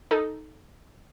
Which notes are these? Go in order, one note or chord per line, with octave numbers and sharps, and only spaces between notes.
D#4 A4